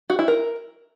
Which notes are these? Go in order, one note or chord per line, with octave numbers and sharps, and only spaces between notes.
F#4
E4
A#4